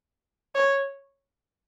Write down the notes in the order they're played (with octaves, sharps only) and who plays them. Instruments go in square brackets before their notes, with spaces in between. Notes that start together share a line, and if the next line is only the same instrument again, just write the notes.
[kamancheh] C#5